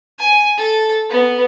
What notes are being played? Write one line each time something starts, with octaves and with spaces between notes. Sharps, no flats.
G#5
A4
B3